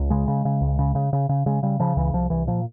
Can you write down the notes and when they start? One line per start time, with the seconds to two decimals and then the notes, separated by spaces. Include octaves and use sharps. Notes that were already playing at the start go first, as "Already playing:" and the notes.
Already playing: C#2
0.10 C#3 G#3
0.28 C#3
0.45 C#3
0.61 C#2
0.79 C#3
0.95 C#3
1.13 C#3
1.29 C#3
1.46 C#3 G#3
1.63 C#3 G3
1.80 C#3 F3
1.97 C#2 E3
2.13 C2 F3
2.30 C2 E3
2.47 A#2 F3